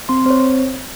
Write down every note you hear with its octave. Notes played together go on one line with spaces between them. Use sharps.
C4 C6
C4 C5 C#5